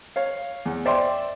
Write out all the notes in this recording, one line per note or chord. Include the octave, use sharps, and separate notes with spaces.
C#5 F5
E2
C5 D5 E5 G5 C6